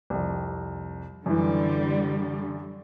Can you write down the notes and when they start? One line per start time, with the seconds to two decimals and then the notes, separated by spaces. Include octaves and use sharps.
0.10 C2 F2
1.26 F#2 D3 E3 G3